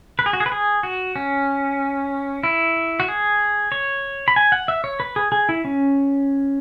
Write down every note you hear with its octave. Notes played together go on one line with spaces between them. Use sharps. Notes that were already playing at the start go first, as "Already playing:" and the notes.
B4
G#4
F#4
G#4
B4
G#4
F#4
C#4
E4
F#4
G#4
C#5
B5
G#5
F#5
E5
C#5
B4
G#4
G#4
E4
C#4